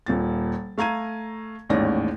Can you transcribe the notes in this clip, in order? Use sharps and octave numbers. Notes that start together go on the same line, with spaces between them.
D#1 A#2 A6
A3 F5 A#5 G#6 D#7
A1 D#2 G#2 C#4 D5 A#6